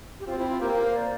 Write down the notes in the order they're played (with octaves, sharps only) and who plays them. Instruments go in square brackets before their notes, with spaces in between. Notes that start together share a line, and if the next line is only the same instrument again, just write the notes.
[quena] G4
[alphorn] C4 [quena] F4
[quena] E4
F4
[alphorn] A#3 [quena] G4
[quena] A#4
C5
D5